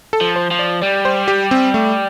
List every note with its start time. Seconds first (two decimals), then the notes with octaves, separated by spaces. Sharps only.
0.13 A4
0.21 F3
0.36 C5
0.51 F3
0.59 D5
0.82 G3 D5
1.05 C5
1.28 G4
1.51 C4
1.74 A3